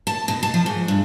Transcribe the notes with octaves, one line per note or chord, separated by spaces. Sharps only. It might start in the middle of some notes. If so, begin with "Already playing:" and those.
A5
B2
A5
F3
G#2
G2